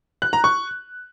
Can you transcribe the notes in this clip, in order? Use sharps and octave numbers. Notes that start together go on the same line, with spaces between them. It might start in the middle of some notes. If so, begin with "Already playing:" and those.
F#6
A#5
C#6